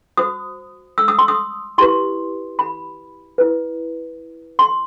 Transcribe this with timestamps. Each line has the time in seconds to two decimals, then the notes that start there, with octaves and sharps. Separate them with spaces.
0.17 F#4 C5 D#6
0.98 E6
1.08 D#6
1.18 C6
1.28 D#6
1.78 E4 G4 B4 C6
2.59 B5
3.38 E4 B4
4.59 C6